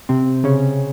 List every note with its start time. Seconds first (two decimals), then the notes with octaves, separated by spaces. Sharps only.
0.09 C3 C4
0.44 C#3 C#4